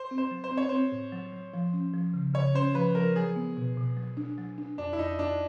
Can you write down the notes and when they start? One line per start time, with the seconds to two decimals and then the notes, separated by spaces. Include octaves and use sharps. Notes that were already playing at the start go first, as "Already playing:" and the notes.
Already playing: C5
0.11 C4
0.18 C5
0.31 F#3
0.44 C5
0.51 C4
0.57 C#5
0.69 C4 C5
0.92 A2
1.12 F#3
1.33 F#3
1.54 F3
1.73 C#4
1.93 F3
2.14 C#3
2.34 C#3 C#5
2.54 C#4 C5
2.75 F3 B4
2.95 F3 A#4
3.16 F#3 G#4
3.36 B3
3.57 B2
3.77 B2
3.97 F#3
4.17 D4
4.38 F#3
4.58 D4
4.78 F2 D4
4.93 E4
4.99 F2 D#4
5.19 F2 D4